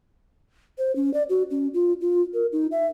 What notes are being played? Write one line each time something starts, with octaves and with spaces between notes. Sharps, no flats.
C5
C#4
D5
F#4
C#4
F4
F4
A#4
D#4
E5